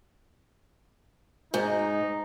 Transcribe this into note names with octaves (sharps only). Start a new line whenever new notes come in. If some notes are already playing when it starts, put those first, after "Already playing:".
G#2 D#4